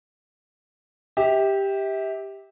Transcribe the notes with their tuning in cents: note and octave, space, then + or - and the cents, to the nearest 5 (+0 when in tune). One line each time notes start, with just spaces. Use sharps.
G4 +5 E5 -30